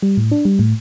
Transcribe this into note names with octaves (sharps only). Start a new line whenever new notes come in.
G3
A2
D4
G3
A2